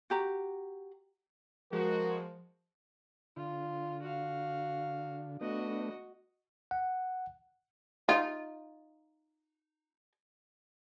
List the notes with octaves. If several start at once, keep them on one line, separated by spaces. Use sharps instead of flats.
F#4 G4 A#5
F3 G#3 F#4 A#4
D3 F4
F#4 F5
A3 B3 D4 F#4 D#5
F#5
D#4 F4